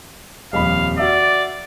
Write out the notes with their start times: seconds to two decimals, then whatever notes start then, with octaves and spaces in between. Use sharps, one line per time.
0.53 D#1 F2 F5 B5
0.98 F#4 D5 E5 E6